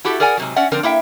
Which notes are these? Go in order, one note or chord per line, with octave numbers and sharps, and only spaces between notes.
E4 F#4 G4 A4
G#4 A#4 D5 F#5 G#5
G#2 C3 F#3
C#4 D5 E5 F#5
D3 F3 C4 D4 A#4
A#3 E4 E5 G5